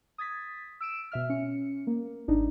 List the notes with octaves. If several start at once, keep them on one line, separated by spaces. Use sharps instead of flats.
D#6 G#6 A6 B6
E6 D7 E7
B2 E5 F6
C#4 C#7
A#3
G#1 D4 D#4